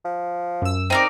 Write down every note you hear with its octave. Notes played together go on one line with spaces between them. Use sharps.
F3
F#2 E6
C4 D#4 A#4 D5